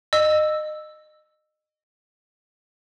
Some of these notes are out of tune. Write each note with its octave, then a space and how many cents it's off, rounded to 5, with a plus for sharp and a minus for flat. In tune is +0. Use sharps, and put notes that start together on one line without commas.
D#5 -25 E6 +0